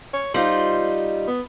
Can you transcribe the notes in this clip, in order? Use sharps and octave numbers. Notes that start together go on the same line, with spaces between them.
C#5
G3 D#4 F4 C5
B3